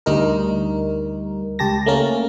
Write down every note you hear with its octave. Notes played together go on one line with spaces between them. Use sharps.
D2 G3 D#4 A#4
C#2 G4 A5 A#6
A3 A#3 C#4 A#4